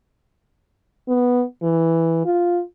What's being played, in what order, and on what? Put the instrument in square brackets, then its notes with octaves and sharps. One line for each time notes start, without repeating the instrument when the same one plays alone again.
[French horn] B3
E3
F4